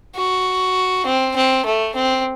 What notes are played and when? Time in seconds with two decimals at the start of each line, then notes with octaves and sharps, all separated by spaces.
0.15 F#4
1.05 C4
1.36 C4
1.65 A3
1.95 C4